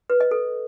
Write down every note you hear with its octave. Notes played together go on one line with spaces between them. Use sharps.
B4
D#5
A4